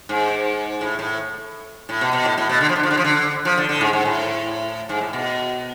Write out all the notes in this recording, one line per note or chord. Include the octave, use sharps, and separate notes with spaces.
G#2
A2
A2
A2
B2
B2
A2
A2
B2
D3
F3
D3
F3
D3
F3
D3
F3
D3
D3
A2
G#2
G#2
A2
G#2
A2
B2